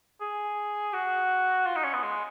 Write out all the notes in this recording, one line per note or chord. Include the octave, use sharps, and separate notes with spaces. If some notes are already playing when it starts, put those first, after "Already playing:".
G#4
F#4
F4
D#4
C#4
B3
G#3